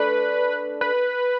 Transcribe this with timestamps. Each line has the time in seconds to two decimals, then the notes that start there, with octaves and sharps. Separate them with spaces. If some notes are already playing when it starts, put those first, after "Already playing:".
Already playing: A3 D4 A4 B4 D5
0.81 B4